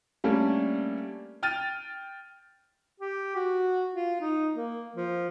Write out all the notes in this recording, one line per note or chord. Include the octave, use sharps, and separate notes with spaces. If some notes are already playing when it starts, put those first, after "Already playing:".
G3 A3 A#3 C#4 D4
G5 F6 A6 D#7
G4
F#4
F4
D#4
A#3
F3